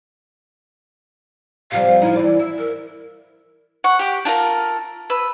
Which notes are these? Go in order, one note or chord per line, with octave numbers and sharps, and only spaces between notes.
C3 F3 G3 F5
F3 D#4 E4
E3 D5
E4
A#4
F#5 C#6
G4 D6
D4 F4 A4 A#4
B4 E6